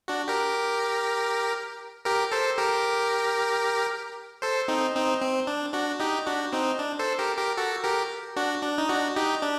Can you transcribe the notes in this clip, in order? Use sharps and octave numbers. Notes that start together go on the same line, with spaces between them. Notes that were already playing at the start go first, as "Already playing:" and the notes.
D4 F#4
G4 A#4
G4 A#4
A4 C5
G4 A#4
A4 C5
C4 D#4
C4 D#4
C4
D4
D4 F#4
D#4 G4
D4 F#4
C4 D#4
D4
A4 C5
G4 A#4
G4 A#4
F#4 A4
G4 A#4
D4 F#4
D4
D#4
D4 F#4
D#4 G4
D4